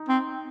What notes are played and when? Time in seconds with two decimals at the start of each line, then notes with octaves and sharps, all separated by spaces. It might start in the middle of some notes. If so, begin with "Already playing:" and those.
Already playing: D#4
0.09 C4